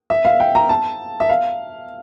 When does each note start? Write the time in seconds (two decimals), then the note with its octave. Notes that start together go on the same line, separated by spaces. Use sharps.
0.10 E5
0.25 F5
0.40 G5
0.55 A#5
0.69 A5
1.20 E5
1.29 F5